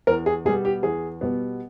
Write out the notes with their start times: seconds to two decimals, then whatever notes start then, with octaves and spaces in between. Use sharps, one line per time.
0.07 E2 A#4
0.26 G#4
0.45 B2 G3 B3 G#4
0.65 G4
0.83 E2 G#4
1.21 B2 G3 B3